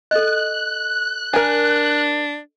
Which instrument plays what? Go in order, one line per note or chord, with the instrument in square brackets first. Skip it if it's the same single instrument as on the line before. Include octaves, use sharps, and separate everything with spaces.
[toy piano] A4 D#5 [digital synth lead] F#6
[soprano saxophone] D4 [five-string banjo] A#4 G#5